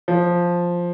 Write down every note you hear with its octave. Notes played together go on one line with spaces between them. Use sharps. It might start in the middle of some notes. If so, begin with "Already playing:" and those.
F3